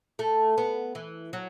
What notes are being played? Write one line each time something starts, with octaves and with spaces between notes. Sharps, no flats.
A3
B3
E3
F#3